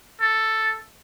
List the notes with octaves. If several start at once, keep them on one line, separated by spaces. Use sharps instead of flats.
A4